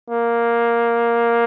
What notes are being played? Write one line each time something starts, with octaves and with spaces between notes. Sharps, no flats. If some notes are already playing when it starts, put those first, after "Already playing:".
A#3